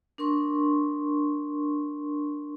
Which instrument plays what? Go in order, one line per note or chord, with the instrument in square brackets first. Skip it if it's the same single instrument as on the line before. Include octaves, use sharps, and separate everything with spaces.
[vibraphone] D4 A#4 C6 C#6